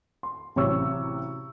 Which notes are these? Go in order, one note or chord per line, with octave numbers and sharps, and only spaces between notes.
C6
A1 C3 F#3 C#5 C#6 E6